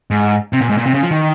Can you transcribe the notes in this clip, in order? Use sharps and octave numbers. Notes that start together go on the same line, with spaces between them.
G#2
C3
A#2
G#2
A#2
C3
C#3
F3
D#3